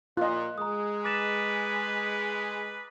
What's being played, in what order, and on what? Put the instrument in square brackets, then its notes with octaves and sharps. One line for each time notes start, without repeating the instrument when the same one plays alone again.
[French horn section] A#2 [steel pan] F4 D#5 [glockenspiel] F#6
[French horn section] G#3 [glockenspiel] A#5 D#6
[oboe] B4 [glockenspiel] D6 A6 E7